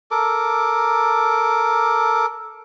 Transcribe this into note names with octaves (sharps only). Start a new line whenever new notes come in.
A4 A#4 D6